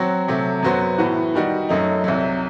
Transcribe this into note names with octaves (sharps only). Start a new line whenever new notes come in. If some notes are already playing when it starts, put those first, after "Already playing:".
Already playing: F#3 C4 F#4
C3 F#3 A3
F#2 F#3 B3 F#4 C5
A2 E3 B3 F#4
D#3 G3 D#4 F#4
F#2 F#3 A3 D#4
C2 C3 F#3